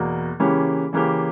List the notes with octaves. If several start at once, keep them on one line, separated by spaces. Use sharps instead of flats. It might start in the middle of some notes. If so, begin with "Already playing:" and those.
Already playing: E2 B2 A#3
C#3 E3 A#3 C#4 G4
C#3 E3 A#3 C#4 G4